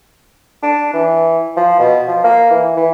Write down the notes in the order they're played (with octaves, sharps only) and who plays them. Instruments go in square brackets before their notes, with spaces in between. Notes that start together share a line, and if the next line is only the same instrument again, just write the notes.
[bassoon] D4
E3
F3
B2
F3
A#3
E3
E3